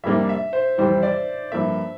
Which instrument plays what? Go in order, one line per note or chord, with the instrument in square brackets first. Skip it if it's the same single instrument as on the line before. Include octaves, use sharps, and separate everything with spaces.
[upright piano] F2 C3 G3 A#3 D4 [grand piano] E5
[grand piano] E5
C5
[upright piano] F2 C3 E3 G3 [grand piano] C5
[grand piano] D5
[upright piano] G2 F3 A#3 [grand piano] E5